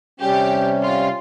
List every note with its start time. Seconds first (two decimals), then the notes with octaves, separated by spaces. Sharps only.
0.20 C3 G3 C#4 G4
0.83 F4